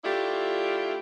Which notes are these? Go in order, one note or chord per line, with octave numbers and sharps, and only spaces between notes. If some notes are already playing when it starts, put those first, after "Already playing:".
A3 D4 E4 F4 G4